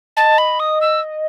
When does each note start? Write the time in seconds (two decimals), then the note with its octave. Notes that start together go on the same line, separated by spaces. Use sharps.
0.16 D#5 A5
0.38 B5
0.60 D#6
0.81 E6